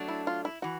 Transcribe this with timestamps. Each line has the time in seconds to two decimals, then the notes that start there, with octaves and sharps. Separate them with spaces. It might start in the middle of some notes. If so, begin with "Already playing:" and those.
Already playing: F#3 A3 D4
0.08 E4
0.27 F4
0.45 E4
0.62 E3 F#4